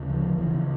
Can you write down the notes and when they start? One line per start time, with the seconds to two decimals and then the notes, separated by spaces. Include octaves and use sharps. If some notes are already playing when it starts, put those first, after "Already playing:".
Already playing: D2 C#3
0.09 F3
0.38 C#2 C#3 E3